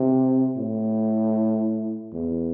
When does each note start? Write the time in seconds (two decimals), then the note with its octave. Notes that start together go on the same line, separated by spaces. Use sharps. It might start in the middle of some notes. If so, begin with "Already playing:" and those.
Already playing: C3
0.57 A2
2.13 E2